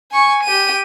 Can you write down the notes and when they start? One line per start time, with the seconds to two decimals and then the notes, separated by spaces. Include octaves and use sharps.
0.12 G#5 C#6
0.43 G4 D#7